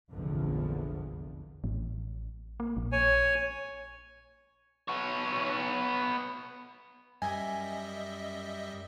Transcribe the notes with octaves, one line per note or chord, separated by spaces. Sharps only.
F1 A#1 E2 D3 F3
A1
A#3
A#1
C#5 G#5
B3 C#5
F#2 G3 D#5 E5 G#5